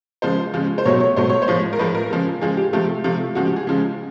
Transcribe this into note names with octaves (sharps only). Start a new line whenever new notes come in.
C#3 F3 G#3 C5
C#3 F3 G#3
C5
B2 F#3 A3 C#5
C#5
B2 F#3 A3 C5
C#5
C5
A2 F3 G#3
A#4
A2 F3 G#3 B4
A#4
C#3 F3 G#3
C#3 F3 G#3 G#4
G4
C3 F3 A3 G4
C3 F3 A3
C#3 F3 G#3 F#4
G4
G#4
C#3 F3 G#3